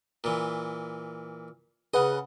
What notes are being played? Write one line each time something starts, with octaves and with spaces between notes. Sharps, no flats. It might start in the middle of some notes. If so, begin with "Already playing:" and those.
A#2 E3
C#3 G#4 B4 D#5 F#5